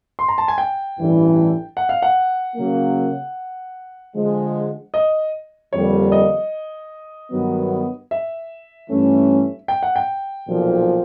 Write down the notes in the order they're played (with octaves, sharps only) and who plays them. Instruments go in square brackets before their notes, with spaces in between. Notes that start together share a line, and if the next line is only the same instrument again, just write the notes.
[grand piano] C6
A#5
A5
G#5
G5
[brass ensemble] A1 G2 E3 A3 D4
[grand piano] F#5
F5
F#5
[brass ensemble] C#3 F#3 A#3
D3 F3 G#3
[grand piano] D#5
[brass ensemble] F2 D3 G3 A#3 [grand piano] C#5
[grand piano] D#5
[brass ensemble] G2 D#3 F#3 B3
[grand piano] E5
[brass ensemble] G2 E3 A3 C#4
[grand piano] G5
F#5
G5
[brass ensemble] B1 A#2 F3